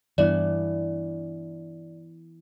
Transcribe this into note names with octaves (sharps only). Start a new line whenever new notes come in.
G2 E3 B3 D4 D5